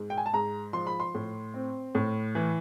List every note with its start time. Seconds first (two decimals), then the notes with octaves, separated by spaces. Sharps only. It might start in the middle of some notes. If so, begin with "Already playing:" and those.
Already playing: G#2
0.10 G5
0.18 G#5
0.26 A5
0.33 G#2 A#5
0.73 F3 C6
0.87 B5
1.00 C6
1.15 A2
1.54 C4
1.95 A2
2.35 E3